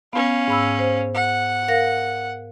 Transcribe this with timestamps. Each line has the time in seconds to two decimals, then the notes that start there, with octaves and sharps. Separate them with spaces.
0.13 B3 C#4 F5
0.48 G#2 B5 E6
0.79 C5
1.14 F#5
1.68 A#4 F5 A#6